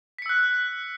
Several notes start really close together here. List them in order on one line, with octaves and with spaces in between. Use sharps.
B6 C#7 E6 F#6